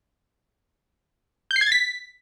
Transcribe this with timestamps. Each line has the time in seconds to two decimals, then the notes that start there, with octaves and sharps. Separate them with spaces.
1.51 G6
1.56 C7
1.61 G#6
1.66 A6
1.72 B6